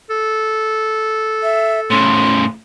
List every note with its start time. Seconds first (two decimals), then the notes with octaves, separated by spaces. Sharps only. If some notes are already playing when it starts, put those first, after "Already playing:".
0.10 A4
1.43 E5
1.90 A2 C#3 C6